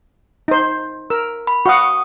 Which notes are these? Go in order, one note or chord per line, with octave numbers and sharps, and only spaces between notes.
D#4 C5
A#4 E6
B5
F#4 F5 F#5 C#6 D#6